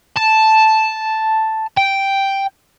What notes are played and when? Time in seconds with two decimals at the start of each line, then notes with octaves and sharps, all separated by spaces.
0.16 A5
1.77 G5